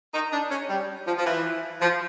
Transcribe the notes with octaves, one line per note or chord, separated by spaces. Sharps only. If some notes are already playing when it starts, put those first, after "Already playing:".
D#4
D4
C#4
G3
F3
F3
E3
F3